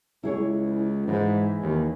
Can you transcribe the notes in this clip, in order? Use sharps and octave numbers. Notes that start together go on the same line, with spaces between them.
C#2 E4 G#4 C#5
G#2 E3
D#2